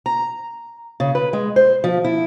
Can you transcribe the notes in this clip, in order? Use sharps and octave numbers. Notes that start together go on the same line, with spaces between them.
A#5
C#3
B4
G#3
C5
F3
E4